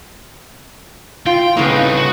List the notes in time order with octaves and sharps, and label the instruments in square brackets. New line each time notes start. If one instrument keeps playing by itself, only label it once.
[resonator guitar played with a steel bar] F4 [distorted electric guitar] G5
[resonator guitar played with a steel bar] A2 C#3 B3 [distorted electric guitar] A#3 G#4
[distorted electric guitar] C2 D#4
F#4